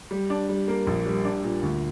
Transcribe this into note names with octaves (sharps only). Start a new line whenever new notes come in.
G3
D4
G3
A#3
A#1
G3
D4
A#2
D2